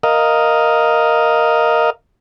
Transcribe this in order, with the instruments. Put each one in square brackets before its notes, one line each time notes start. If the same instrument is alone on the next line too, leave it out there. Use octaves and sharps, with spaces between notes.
[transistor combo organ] A#4 D#5 F5